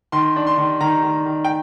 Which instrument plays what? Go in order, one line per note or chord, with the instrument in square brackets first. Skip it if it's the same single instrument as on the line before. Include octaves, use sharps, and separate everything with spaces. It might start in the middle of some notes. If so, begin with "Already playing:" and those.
[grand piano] D#3 C6
D4
C6
D#3
D#3 A#5
D#3
D#3
G5